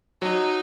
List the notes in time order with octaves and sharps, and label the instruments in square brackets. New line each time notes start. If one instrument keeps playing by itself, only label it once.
[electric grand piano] F#3 [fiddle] D#4